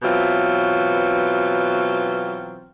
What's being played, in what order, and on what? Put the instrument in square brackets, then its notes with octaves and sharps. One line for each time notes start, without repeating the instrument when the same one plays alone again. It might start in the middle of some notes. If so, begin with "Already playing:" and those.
[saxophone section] B2 E3 F#3 C4 F4